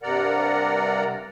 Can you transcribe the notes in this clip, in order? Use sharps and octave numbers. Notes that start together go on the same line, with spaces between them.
G2 C3 A#4 D5 F#5 A#5